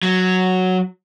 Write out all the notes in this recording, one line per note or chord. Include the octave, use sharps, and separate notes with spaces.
F#3